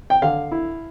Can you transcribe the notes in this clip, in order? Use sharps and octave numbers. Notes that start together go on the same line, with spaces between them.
G5
D3 F5
E4